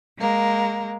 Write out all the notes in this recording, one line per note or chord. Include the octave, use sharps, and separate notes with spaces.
G#3 A#3